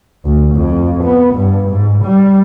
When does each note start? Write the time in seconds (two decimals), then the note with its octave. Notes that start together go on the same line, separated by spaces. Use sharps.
0.25 D2
0.56 F2
1.04 B3
1.35 G2
1.70 G#2
2.05 G3